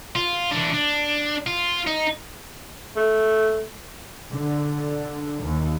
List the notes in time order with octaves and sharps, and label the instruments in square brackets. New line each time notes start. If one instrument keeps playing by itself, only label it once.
[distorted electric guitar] F4
E3 D4
D4
F4
D#4
[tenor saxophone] A3
[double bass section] D3
D#2